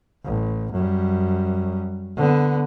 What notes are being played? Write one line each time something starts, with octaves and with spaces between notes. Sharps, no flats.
A1
F#2 G3
D3 B3